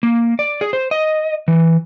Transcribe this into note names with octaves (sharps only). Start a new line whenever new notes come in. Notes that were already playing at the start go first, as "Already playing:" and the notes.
A#3
D5
G#4
C5
D#5
E3